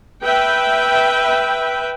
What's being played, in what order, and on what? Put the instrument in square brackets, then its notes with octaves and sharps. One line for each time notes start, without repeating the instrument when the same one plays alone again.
[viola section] B4 E5 G5